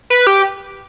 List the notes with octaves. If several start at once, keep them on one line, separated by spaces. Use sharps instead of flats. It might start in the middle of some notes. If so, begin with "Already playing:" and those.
B4
G4